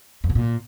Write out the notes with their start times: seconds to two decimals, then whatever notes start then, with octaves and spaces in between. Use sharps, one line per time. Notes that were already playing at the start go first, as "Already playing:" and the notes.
0.24 F2
0.30 B2
0.35 A#2